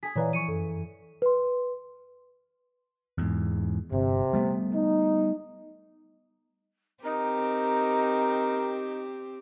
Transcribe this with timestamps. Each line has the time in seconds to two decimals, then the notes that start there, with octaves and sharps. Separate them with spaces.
0.03 G#4 G#5 B6
0.16 A#2 E3 B4 C#5 D5 F5 A#5
0.33 F3 C#6 C#7 D#7
0.48 F#2 A4
1.22 B4 C6
3.18 E2 G#2
3.92 G1 C3
4.33 G3 A3 B3
4.75 D#4
7.04 C4 D#4 G4 A#4